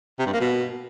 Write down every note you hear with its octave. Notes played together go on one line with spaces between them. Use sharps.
C3
G2
A#3
B2